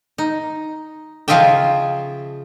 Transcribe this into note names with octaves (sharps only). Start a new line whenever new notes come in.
D#4
C#3 F3 F4 D#5 E5 G5